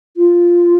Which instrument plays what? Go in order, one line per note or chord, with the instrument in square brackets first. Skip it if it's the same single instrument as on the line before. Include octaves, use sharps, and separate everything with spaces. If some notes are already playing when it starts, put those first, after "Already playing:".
[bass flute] F4